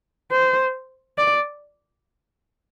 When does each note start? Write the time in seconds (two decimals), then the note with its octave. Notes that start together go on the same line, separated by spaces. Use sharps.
0.32 C5
1.18 D5